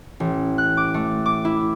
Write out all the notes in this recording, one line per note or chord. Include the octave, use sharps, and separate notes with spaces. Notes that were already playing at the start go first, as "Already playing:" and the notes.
A1
F#6
D6
A3
D6
E4